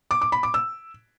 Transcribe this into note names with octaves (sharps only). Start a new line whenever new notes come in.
D6
D6
B5
D6
E6